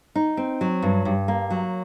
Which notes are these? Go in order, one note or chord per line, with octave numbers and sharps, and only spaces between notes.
D#4
C4
F#3
G2
G2
A#3
F#3